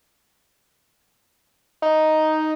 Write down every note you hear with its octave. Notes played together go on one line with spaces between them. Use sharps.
D#4